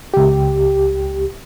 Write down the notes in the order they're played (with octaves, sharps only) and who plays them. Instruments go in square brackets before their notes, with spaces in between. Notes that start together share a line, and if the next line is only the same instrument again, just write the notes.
[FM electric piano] C#2 G4